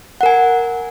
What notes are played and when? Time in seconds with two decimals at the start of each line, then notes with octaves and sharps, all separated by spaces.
0.21 F#5
0.23 A#4
0.26 G#5